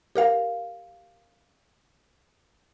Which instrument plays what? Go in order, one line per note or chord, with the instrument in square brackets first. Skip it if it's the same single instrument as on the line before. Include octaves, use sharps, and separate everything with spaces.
[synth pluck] G4 A#4 F5